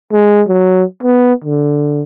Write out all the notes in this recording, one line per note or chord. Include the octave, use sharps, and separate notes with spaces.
G#3
F#3
B3
D3